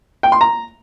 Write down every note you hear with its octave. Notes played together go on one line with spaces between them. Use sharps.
G5
C6
A#5